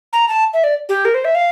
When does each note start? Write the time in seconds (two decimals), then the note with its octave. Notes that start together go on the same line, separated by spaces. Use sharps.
0.13 A#5
0.28 A5
0.54 E5
0.64 D5
0.89 G4
1.05 A#4
1.14 C5
1.25 E5
1.35 F5